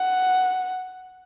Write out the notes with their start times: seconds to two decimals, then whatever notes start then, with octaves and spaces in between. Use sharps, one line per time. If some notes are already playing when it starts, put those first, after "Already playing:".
Already playing: F#5